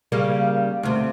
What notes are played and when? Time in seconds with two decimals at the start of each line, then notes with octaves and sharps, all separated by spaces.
0.12 C#3 G3 A#3
0.83 D2 C3